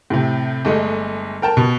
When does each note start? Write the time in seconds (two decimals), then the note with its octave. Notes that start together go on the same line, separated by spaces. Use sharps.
0.10 A2 C3
0.65 G1 G#3 A3 D#5
1.42 A#4 G5 A5
1.57 B2